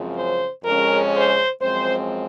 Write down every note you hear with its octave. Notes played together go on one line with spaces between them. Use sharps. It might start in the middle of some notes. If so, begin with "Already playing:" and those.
Already playing: F#2 C#3 F3 G#3 C4
C5
F2 C#3 G#3 C#4 A#4
C5
F#2 F3 G#3 C4 C5